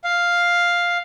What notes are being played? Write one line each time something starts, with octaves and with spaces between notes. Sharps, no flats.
F5